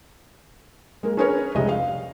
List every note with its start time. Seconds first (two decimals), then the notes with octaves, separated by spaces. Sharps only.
1.03 G#3 A#3 A#4
1.17 C#4 D4 G#4 A#4 B4 C#5
1.55 F1 C2 G#3 G4 D#5
1.69 F5